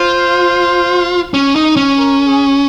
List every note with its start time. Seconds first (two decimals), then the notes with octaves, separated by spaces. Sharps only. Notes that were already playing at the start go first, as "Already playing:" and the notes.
Already playing: F4 C5
1.34 C#4
1.56 D#4
1.77 C#4
1.98 A#4
2.26 G#4